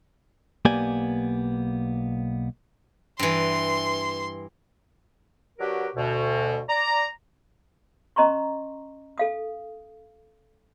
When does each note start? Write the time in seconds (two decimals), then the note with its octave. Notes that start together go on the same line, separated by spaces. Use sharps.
0.65 B1 A#3 B3 G4 D5 G#5
3.19 G2 E3 C6
5.59 F#3 D4 F#4 G4 A#4 B4
5.95 D2 B2
6.68 D5 A#5
8.16 C#4 D#5 A#5 C6 C#6
9.18 A4 F5 D#6